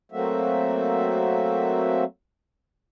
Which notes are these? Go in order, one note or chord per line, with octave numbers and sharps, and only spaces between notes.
F#3 A3 A#3 C4 F#4 E5